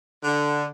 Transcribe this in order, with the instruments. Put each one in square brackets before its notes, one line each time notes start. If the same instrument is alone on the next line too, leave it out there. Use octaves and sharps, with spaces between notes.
[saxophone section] D3